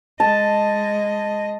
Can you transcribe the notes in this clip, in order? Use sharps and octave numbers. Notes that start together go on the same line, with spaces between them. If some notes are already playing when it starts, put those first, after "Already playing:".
G#3 D#5 A5